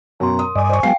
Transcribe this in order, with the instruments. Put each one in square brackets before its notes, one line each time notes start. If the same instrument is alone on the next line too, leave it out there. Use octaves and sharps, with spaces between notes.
[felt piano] F#2 B2 [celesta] A#4 C6 [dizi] A#5
[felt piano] D#6
[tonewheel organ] G2 D5 D#5 [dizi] G#5
[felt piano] C5 C#6
[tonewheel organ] F#3 G#3 B3 [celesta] F5 G5 [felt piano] C7